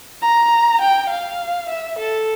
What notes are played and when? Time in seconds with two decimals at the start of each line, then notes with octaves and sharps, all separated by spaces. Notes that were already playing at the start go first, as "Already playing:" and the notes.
0.22 A#5
0.81 G5
1.09 F5
1.69 E5
1.98 A4